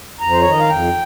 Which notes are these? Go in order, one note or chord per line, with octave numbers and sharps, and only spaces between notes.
F2 A#5
C5
D#3 C#5
D#5
F5
F2 G5